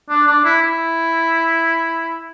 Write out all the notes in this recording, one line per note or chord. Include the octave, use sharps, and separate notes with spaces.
D4
D4
E4
E4